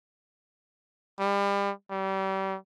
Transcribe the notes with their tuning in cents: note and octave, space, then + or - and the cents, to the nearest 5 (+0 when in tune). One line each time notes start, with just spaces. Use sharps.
G3 +35
G3 -30